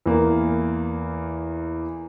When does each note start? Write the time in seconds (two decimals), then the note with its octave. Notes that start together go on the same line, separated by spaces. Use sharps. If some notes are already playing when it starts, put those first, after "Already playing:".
0.06 E2 A#3